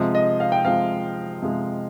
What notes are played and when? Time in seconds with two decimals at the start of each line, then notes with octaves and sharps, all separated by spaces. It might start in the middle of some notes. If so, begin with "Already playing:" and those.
Already playing: C3 F3 G#3
0.15 D#5
0.40 F5
0.52 G5
0.65 C3 F3 G#3 F5
1.42 C3 F3 G#3